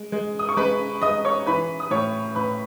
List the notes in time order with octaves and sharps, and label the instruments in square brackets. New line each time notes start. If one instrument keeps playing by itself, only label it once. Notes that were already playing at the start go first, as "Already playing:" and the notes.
Already playing: [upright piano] G#3
G#3
D#6
C#6
G#3 B4 B5
G#3 D#5 D#6
C#5 C#6
E3 B4 B5
D#6
A2 C#5 C#6
A2 B4 B5